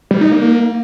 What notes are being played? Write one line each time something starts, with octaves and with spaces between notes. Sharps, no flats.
G3
D#4
A#3
A#3